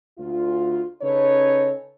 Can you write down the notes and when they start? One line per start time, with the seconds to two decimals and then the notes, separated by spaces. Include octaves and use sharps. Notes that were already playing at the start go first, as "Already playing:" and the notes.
0.18 D2 F4
1.02 C#3 C#4 D#4 A4 B4 C#5